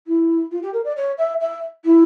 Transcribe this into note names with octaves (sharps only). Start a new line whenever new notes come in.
E4
F4
G4
A#4
D5
C#5
E5
E5
E4